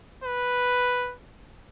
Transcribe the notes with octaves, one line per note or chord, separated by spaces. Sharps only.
B4